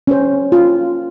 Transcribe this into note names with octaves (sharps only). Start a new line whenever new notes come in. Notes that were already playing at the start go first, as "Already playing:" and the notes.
C#4 C5
F4